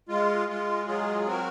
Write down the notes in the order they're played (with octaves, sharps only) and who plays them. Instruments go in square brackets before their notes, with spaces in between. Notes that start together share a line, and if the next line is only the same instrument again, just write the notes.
[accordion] G#3 F4
G#3 F4
F#3 F4 G#4
C4 F#4 A#4